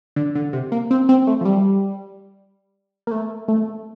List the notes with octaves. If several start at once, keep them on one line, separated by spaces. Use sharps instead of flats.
D3
D3
C3
A#3
C4
C4
A3
F3
G3
A#3
A3
A3